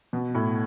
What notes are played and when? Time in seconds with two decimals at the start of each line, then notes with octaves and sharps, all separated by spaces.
0.13 B2
0.35 A2